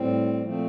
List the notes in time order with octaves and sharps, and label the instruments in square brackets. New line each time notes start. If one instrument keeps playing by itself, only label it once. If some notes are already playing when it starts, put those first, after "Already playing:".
Already playing: [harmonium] A2 G3 C4
A#2 F3 A3 C4